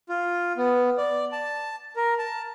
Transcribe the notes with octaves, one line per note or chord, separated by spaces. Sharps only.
F4
B3
D5
A5
A#4
A5